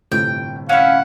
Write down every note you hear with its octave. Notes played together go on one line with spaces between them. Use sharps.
G1 A2 C3 G5
C#4 E4 F5 F#5